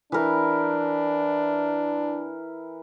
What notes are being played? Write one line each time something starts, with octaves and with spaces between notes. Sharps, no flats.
E3 D4 A#4